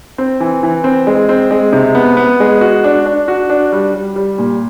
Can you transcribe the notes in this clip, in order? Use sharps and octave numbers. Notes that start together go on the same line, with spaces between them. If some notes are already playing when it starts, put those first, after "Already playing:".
C4
E3
E3
C4
G#3
C4
G#3
C3
B3
B3
G#3
F#4
D4
D4
F#4
D4
G3
G3
G3
A#2